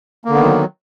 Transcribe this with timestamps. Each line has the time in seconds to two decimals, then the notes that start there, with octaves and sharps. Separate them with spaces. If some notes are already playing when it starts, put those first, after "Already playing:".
0.25 A#3
0.29 D3
0.34 B3
0.39 D#3
0.43 F#3